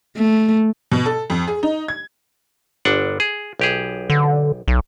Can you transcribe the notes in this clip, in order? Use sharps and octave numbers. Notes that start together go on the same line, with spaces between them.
A3
B2
A4
F2
G#4
D#4
G#6
G1 D4 F#5
G#4
B1 G4 G#4
D3
B1